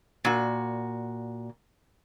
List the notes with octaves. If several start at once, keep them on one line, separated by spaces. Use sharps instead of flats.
A#2 F#4